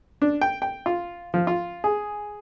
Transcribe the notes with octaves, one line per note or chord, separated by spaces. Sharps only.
D4
G5
G5
F4
F3
F4
G#4